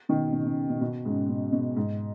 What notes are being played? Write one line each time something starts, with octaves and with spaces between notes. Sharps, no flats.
B2 D#3
B2
C#3
B2
B2
B2
G#2 C#3
B2
B2
G#2